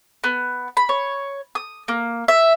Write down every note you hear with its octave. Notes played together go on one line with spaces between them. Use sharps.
B3
B5
C#5
D#6
A#3
E5